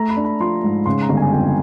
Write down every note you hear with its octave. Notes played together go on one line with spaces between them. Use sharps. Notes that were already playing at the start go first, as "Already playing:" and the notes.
Already playing: A3 A#5
B5
D4
B5
F3 C6
G#2
C#3 C6
A#5
G1
G#5
F2 G5